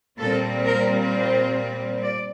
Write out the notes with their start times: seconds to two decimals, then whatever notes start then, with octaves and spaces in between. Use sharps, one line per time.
0.18 A#2 G3 C4 A4
0.64 A#4
1.12 C5
2.03 D5